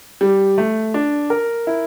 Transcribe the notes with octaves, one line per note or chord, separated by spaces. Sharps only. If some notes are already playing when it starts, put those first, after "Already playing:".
G3
A3
D4
A#4
E4